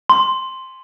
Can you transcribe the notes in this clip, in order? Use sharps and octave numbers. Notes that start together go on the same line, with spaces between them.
C6